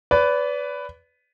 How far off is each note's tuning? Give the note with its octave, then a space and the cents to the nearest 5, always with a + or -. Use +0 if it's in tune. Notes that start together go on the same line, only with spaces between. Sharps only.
B4 +10 D5 -30